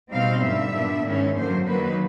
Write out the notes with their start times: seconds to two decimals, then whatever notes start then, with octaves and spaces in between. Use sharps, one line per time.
0.11 B2 G3 C4 D#4 F5
0.42 G2 D3 G3 E5
0.74 A#2 G3 B3 D4
1.05 G#2 D#3 G#3 C#4 E4
1.35 F#2 D3 F#3 A#3 C5
1.66 D#3 F#3 A#3 B4